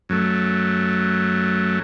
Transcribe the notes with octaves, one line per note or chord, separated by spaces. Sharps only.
F#2 F#3 A3